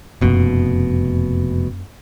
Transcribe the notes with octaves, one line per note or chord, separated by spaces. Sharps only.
F1 F#2 B2 A#3